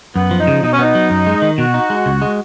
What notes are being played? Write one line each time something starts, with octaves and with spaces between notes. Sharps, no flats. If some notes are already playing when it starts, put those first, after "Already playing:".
F#2 B3
F3
D#4
C#3
B2 D#4
C#4
B3 D#4
F#3
F#2
G#3
D#3
B2 F#4
D#4
G#3
C#2
G#3